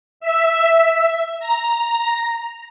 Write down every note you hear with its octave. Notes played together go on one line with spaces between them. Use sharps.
E5
A#5